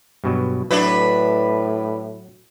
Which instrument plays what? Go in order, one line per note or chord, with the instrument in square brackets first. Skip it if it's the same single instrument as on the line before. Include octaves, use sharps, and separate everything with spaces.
[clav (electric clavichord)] G2 B2 F#3
[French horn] A2 [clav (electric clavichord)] F#3 [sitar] D4 E4 B4